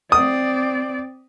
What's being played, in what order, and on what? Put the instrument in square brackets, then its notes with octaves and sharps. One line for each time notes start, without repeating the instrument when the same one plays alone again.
[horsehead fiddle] C4 D5 [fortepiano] D#6